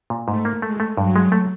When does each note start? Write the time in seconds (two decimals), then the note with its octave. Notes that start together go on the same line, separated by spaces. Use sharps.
0.10 A#2
0.28 G#2 A3
0.45 A#3
0.62 G#3 A3
0.80 A3
0.97 G2 F#3
1.16 G#3
1.32 A3